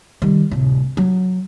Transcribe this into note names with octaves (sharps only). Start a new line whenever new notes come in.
D#3 G3
D1 C3
F#3